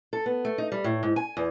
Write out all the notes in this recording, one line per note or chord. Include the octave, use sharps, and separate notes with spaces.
A4
B3
A3
D#4
G3
A2
G#2
G#5
E2